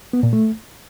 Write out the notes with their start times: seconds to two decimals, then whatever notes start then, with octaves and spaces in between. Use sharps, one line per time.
0.13 B3
0.23 A#2
0.33 A3